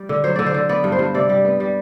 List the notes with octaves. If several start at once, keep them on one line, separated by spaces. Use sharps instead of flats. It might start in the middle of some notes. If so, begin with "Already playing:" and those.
Already playing: G3 D5
D3
F#3 C5
D3 D5
C5
D3
B3 D5
G2
C5
G2
C3 D5
G3
B3
G3